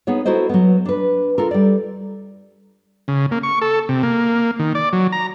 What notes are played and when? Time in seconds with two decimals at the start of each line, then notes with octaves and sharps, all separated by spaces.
0.07 B3 D#4 G#4 C#5
0.25 E4 F#4 A4 A#4 C5 D#5
0.49 F#3 B3
0.85 D4 B4
1.38 F4 A4 A#4
1.51 G3 D5
3.08 C#3
3.31 A#3
3.43 C#6
3.62 A4
3.89 C3
4.03 A#3
4.59 D#3
4.75 D5
4.93 F#3
5.12 A#5